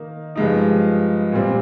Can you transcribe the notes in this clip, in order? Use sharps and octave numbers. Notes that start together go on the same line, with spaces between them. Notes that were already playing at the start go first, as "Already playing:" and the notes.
Already playing: D#3 A#3 D#4
G2 F3 G#3 D#4
A#2 G3 C4